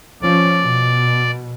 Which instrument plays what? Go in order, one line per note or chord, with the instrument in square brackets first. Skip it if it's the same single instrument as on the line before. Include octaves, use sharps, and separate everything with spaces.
[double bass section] F3 C#4 [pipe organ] D5
[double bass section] B2